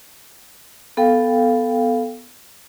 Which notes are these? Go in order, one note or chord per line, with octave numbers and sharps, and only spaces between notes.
B3 A4 F5 G5